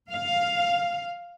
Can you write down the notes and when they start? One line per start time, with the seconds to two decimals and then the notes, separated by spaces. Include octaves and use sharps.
0.10 F5